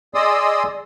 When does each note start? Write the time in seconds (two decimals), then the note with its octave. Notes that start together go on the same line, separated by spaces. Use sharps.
0.14 G#4 D5 D#5 C6 D#6 E6